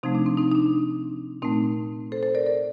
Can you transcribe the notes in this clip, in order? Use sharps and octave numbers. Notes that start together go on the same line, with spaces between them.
C3 F3 A3 C4 D#4
D4
C4
C4 D#4
D#4
D4
A#2 A3 C4 D#4
A4 C5
A4 C5
A#4 D5
A#4 D5